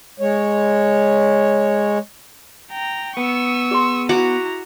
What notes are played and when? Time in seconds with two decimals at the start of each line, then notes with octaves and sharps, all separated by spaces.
0.20 G#3 C#5
2.71 G5 A#5
3.17 B3 C#6 E6
3.71 G#4 C6
4.09 E4 F#4 F#5 A#5 D6